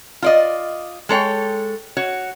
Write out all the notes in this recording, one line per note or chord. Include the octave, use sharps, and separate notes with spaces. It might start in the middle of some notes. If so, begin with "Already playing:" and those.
F4 D5 D#5
G#3 A4 C#5 G5
F#4 C#5